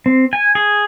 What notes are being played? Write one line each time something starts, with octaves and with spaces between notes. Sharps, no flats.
C4
G#5
G#4